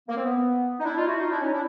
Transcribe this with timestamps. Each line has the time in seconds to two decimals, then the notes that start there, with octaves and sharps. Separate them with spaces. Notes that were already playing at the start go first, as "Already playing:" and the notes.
0.08 A#3
0.16 C4
0.24 B3
0.80 D#4
0.84 D4 E4
0.96 D#4 F4
1.07 E4 F#4
1.18 D#4 F4
1.30 D4 E4
1.41 C#4 D#4
1.52 D4 E4